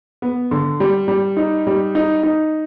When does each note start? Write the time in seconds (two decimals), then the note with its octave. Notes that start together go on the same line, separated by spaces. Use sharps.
0.22 B3
0.51 D3
0.80 G3
1.08 G3
1.37 D#4
1.67 G3
1.95 D#4
2.23 D#4